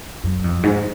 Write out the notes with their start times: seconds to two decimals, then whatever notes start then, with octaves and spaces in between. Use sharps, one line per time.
0.24 F#2
0.44 F2
0.63 G#2